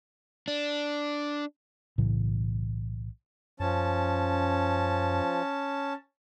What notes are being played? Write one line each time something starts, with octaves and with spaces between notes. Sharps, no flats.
D4
B1 A2 C#3 E3
F#2 F3 C#4 A5